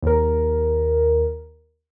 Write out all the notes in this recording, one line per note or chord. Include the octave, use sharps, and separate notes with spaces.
D#2 A#4